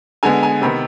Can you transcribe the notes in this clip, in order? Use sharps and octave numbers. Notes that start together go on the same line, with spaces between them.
D3 G#3 B3 G#5
G#5
C3 D#3 B3 B5